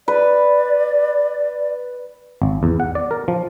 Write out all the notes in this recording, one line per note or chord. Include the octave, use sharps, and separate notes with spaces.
B4 D5
G#1
E2
F#5
D5
A#4
F3